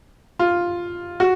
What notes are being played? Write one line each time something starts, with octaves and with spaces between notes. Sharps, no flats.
F4
F#4